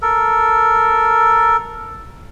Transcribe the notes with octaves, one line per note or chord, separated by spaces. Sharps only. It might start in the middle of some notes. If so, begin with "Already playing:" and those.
A4 A#4